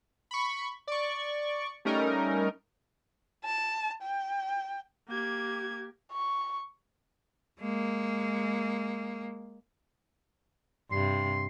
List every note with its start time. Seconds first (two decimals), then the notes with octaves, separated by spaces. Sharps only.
0.31 B5 C#6
0.87 D5 C#6
1.85 G3 A3 C#4 D#4 A#4
3.44 A5
4.03 G5
5.09 A#3 G4 G#6
6.12 C#6
7.60 G#3 A#3
10.91 G2 C3 C6